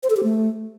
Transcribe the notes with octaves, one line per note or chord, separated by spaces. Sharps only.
C5
A4
G4
A3